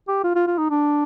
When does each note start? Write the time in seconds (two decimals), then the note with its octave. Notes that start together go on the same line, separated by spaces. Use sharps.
0.08 G4
0.24 F4
0.35 F4
0.47 F4
0.58 D#4
0.70 D4